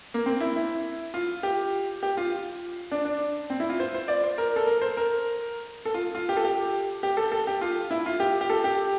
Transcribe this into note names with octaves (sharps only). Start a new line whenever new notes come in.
A#3
C4
E4
E4
F4
G4
G4
F4
D4
D4
C4
E4
F4
C5
C5
D5
C5
A#4
A4
A#4
C5
A#4
A4
F4
F4
G4
A4
G4
G4
A4
A4
G4
F4
E4
F4
G4
G4
A4
G4